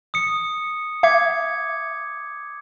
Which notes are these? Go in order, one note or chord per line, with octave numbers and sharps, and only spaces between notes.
D#6 C#7
E5 D6 G#6 C#7